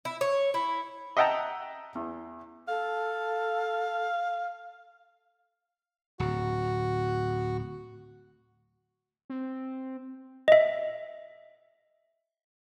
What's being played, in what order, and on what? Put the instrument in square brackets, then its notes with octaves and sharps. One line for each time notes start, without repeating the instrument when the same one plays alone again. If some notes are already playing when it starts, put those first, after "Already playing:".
[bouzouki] E4
C#5
E4
[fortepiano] D#5 E5 F#5 G5 A5 A#5
E2
[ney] A4 [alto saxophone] F5
[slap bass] D1 [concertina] F#4
[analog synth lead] C4
[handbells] D#5 E5